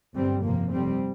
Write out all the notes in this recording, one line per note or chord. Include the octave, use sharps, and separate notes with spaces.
G1 G2 G3 C4
G1 F2 C3 F3 A#3
F1 F2 C3 G3 C4